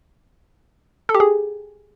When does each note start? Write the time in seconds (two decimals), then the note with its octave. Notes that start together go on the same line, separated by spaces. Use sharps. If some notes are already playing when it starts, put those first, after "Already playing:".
1.09 A4
1.15 G4
1.20 G#4